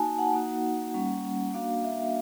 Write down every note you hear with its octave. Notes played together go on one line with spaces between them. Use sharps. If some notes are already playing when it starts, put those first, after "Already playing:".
Already playing: A#3 D#4 F#4 G#5 A5
F#5
A#3 D#4 F#4
G3 A#3 C#4
A#3 D4 F#4 F5
E5